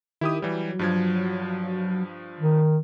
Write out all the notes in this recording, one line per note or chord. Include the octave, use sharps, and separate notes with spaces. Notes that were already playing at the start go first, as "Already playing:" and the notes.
D#3 E4 G4 D#6
E3 F#3 G3
G2 F3 G#6
D#3